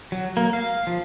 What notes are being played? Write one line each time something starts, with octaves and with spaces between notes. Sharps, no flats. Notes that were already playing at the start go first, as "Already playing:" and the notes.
F#3
A#3
F5
F3